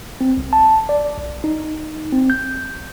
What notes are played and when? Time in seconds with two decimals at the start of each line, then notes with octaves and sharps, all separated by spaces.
0.21 C4
0.37 C2
0.53 A5
0.89 D5
1.18 B1
1.44 D#4
2.12 C4
2.30 G6